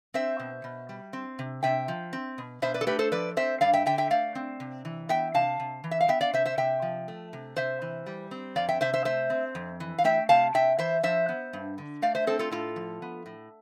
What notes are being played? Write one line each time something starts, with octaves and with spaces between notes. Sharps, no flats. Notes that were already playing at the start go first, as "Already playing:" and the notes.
C4 C5 E5
B2
B2
G3
C4
C3
C3 E5 G5
F3
C4
B2
B2 C5 E5
B4 D5
A4
A3 G4 B4
A4 C5
F3 B4 D5
C4 C5 E5
G2 D5 F5
E5 G5
D3 E5 G5
E5 G5
A3 D5 F5
C4
C3
E3
B3 E5 G5
C3 F5 A5
C3
E3
E5
F5
B3 E5 G5
D5 F5
C3 C5 E5
C5 E5
C3 E5 G5
F3
A3
C3
C3 C5 E5
E3
G3
C4
F2 D5 F5
E5 G5
C3 C5 E5
C5 E5
A3 C5 E5
C4
F2
E3
F5
A3 E5 G5
C3 F5 A5
C3 E5 G5
E3 C5 E5
F3 C5 E5
B3
G2
D3
A3 D5 F5
C5 E5
C4 A4 C5
F4 A4
A2 F4 A4
F3
B3
A2